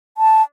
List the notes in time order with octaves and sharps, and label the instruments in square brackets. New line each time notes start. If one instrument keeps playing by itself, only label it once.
[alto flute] A5